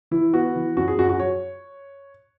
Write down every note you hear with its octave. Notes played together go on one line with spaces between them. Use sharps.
E3 E4
B3 F#4
E3
F#2 F#4
G#4
F#2 F#4
F#4
C#5